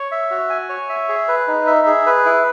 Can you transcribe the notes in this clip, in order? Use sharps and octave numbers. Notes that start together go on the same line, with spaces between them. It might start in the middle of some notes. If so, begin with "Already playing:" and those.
Already playing: C#5
E5
F#4
G#5
C#5
E5
G#4
B4
D#4
E5
G#4
B4
E4